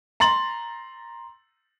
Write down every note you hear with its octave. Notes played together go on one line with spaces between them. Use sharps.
A#5 C6 A6 F#7